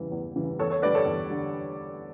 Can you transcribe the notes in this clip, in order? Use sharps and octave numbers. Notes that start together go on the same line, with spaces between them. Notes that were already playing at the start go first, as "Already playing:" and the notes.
Already playing: E2 C#3 E3 G3
E2
C#3 E3 G3
E2 A4 C#5
A4 C#5
D3 G3 B4 D5
A4 C#5
E2
D3 G3